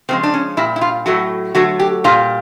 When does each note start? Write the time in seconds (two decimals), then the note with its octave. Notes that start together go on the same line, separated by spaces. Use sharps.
0.09 C#3 F3 G#3 C4
0.23 D4
0.34 C#4
0.57 A#2 G3 E4
0.76 E4
0.81 F4
1.06 A2 F#3 A3 F#4
1.55 D3 F#3 A3 F#4
1.79 G4
2.04 A#2 G3 F4